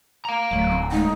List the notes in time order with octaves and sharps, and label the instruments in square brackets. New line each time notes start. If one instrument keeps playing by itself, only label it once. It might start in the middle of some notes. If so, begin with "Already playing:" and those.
[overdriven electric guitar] F5 A#5
[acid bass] D1 [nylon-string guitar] F#3 G3 A3
[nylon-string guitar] C4 G5
[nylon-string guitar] C#3 G#3 A3 [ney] D#4